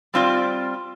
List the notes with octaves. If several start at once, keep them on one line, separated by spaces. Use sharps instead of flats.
G3 C4 F4 D5